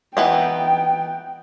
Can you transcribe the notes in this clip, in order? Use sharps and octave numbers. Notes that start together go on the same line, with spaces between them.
E3 B3 D#4 G5